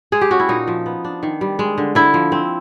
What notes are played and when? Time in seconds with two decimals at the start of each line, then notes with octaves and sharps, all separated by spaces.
0.12 G#3 G#4
0.21 G4
0.31 C#4 F#4
0.40 E4
0.49 A#2 D#4
0.67 F3
0.86 B3
1.05 D4
1.23 D#3
1.41 G3
1.59 G#3
1.78 D3
1.95 D3 E4
2.14 F3
2.32 C4